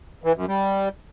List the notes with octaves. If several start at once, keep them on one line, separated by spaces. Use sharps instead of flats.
E3
F#2
G3